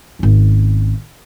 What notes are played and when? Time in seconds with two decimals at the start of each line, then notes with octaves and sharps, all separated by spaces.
0.19 G#1 C#4